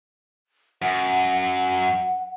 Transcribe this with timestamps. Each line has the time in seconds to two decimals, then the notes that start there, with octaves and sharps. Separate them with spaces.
0.82 F#2 F#5